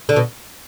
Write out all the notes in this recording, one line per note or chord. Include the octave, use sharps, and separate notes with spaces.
D3
B2